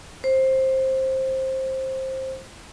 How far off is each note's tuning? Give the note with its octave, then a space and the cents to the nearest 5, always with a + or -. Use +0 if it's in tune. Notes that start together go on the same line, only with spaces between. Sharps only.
C5 +15